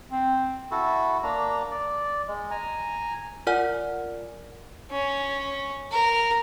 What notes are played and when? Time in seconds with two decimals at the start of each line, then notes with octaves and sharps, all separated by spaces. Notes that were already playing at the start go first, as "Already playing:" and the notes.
0.12 C4
0.71 E4 F#4 A4
1.23 A#3 D4 A#5
1.71 D5
2.28 G#3
2.51 G#5 A#5
3.47 F4 A#4 D5 F#5 G#5 F6
4.91 C#4
5.91 A#4